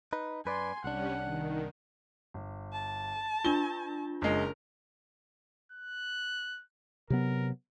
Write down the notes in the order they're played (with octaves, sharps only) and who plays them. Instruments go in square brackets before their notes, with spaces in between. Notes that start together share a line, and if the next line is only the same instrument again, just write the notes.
[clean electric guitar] D#4 B4
[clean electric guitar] F#2 B4 D5 [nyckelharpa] G#5 C6
[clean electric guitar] C2 D4 [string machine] G3 C#4 [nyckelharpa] F#5
[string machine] D#3
[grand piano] G1
[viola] A5
[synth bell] D4 F4 [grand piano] G7
[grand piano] F#1 G#3 [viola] A#4
[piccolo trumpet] F#6
[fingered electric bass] C3 F#3 B3 [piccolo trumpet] A#4